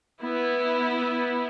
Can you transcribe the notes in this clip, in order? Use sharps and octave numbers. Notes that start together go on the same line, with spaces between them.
B3 E4